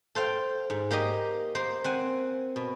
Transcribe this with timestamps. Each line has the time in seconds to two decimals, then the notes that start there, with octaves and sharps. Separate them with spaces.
0.15 A4 C5 F5 G5
0.70 G#2
0.91 A#3 G4 A#4 D#5
1.55 A#3 C5
1.84 C4 F#5 G#5
2.56 B2